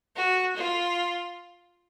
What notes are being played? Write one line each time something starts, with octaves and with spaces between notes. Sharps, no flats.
F#4
F4